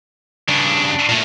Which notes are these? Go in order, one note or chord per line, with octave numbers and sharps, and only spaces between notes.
G2 C#3 D4
A#2 A3